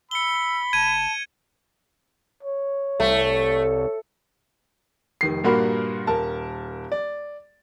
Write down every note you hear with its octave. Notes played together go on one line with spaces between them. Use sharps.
B5 E6 C#7 G7
F#1 A5 G#6 D#7
C#5
C2 A3
F1 D#3 C7
G2 A#2 A#3 F#4 A#4 B5
D#1 A#4 A5
D5